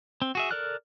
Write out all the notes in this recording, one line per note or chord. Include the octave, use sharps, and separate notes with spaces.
C4
F#4 G#4 E5
A4 A#4 D5 F6 F#6